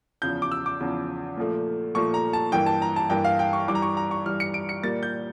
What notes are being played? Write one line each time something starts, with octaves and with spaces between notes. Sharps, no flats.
E2 C#3 F3 G6
D6
E6
D6
E2 C#3 F3
A#2 F3 A3
A#2 F3 A3 C#6
A#5
A5
G2 E3 A#3 G5
A5
A#5
A5
G2 E3 A#3 G5
F5
G5
C#6
G2 E3 G3 D6
A#5
C#6
A#5
C#6
G2 E3 G3 F6
C#7
D7
C#7
A#2 G3 A#3 A6
G6